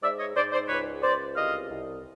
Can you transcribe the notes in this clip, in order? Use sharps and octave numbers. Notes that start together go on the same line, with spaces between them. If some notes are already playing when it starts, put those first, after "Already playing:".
G#2 D5 E5
C#5 D#5
G#2 C5 D5
C5 D5
C#2 B4 C#5
C#2 C5 D5
C2 D#5 F5
C2